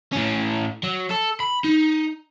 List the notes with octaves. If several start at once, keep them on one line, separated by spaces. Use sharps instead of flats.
A2 C#4
F#3
A4
B5
D#4